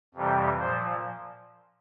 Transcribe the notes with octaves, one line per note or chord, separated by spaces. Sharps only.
F2 C3 E3 G3
A#2 F3 C5